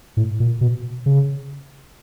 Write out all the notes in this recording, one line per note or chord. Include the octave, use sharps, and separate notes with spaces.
A2
A#2
B2
C#3